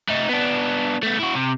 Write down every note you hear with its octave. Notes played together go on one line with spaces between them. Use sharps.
A3 D#4
B3 D4
A3 B3
E4 F#4
C3